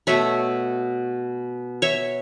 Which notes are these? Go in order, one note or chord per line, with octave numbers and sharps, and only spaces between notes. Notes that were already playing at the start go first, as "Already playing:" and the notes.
B2 A3 C#5 E5
C#5 E5